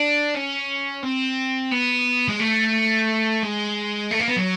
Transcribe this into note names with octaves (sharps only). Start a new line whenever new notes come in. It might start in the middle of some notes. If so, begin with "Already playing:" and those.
Already playing: D4
C#4
C4
B3
G#3
A3
G#3
A3
A#3
B3
F#3